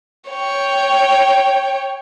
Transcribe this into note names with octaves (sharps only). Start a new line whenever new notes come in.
C#5 G5